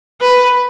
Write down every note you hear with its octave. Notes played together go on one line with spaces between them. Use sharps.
B4